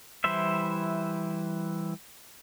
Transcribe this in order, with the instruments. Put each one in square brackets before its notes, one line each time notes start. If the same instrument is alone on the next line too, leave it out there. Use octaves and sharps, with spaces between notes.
[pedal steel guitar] E3 G3 E4 C5 E5